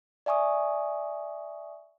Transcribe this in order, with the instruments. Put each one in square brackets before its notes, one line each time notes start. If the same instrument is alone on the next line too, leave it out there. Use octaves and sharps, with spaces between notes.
[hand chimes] D5 E5 G#5 C#6 D#6